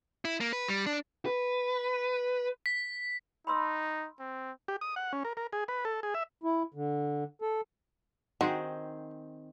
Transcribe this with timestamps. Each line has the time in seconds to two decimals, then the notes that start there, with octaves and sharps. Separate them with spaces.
0.25 E4
0.40 A#3
0.53 B4
0.68 G3
0.86 D4
1.26 B4
2.66 B6
3.47 D#4 B5 C6 E6
4.20 C4
4.68 G4
4.81 D#6
4.96 F#5
5.13 C#4
5.25 A#4
5.37 A#4
5.53 G#4
5.68 B4
5.85 A4
6.03 G#4
6.14 E5
6.43 E4
6.74 D3
7.42 A4
8.41 D#3 C4 F#4 G#4